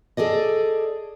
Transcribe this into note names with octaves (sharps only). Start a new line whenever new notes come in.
G#4 A4 D5 D#5